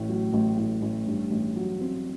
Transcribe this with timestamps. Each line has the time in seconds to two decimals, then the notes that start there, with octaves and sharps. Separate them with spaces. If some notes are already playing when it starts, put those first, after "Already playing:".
Already playing: A1 A2
0.09 F#3
0.33 A1
0.58 A2
0.82 A1
1.06 G2
1.31 A1
1.56 F#3
1.80 C4